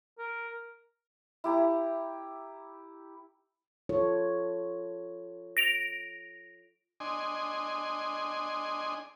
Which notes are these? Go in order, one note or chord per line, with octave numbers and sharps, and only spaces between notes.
A#4
E4 G4 A#5
F4 A4 C#5
A#6 D7 F7
D4 D#5 G#5 C6